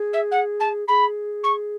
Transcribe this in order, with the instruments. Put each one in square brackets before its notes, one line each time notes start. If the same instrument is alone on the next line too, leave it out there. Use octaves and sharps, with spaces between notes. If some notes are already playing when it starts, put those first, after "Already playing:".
Already playing: [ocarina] G#4
[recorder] E5
F#5
A5
[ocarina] G#4 [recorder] B5
[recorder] C#6